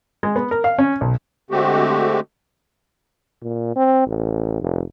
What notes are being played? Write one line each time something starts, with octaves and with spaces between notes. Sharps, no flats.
G#3
B3
A#4
F5
C#4
B1
D3 G#3 A3 C4 F#4 G4
A#2
C4
A1
F1